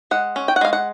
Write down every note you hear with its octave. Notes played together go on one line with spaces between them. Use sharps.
G#3 F#5
C#4
G5
F#5
G#3 F5
F#5